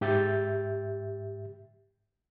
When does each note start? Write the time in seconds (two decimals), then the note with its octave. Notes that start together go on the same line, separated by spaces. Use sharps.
0.01 G#2 G4 E5 G6 A6